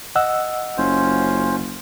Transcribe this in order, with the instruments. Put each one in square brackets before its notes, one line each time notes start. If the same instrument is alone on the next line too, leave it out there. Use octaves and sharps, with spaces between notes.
[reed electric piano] D#5 F#5 E6
[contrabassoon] F#1 [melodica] C#4 F4 C5